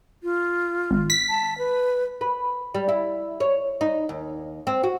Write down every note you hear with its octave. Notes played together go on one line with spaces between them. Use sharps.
F4
G#1
B6
A5
B4
B4
G3
E4
C#5
D#4
D#2
C4
F#4